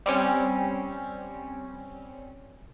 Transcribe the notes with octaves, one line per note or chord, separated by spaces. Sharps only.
G3 C4 C#4